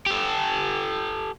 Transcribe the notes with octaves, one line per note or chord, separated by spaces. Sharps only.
G4 A4